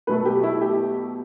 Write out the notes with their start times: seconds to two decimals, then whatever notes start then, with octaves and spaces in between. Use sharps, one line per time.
0.07 B2 F#3 A3 B4
0.25 G4
0.43 E4
0.61 G4